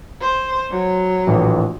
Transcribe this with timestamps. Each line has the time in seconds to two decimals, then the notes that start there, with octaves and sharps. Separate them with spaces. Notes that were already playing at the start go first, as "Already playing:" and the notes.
0.21 C5
0.71 F#3
1.27 A#1 A2 E3